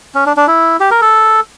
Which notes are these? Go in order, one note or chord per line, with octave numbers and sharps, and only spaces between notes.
C#4
D4
D4
E4
G4
A#4
A4